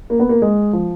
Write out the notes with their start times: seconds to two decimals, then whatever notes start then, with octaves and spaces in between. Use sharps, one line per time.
0.10 A#3
0.20 B3
0.29 A#3
0.42 G#3
0.73 F3